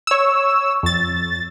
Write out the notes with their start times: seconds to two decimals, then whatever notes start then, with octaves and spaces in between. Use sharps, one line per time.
0.07 C#5 E6
0.83 F2 A6